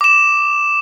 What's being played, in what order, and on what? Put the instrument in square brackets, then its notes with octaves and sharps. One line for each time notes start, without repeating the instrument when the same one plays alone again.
[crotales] D6 E7